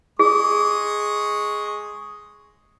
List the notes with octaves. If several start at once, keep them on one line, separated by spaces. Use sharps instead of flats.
G#3 G#4 C#6 D#6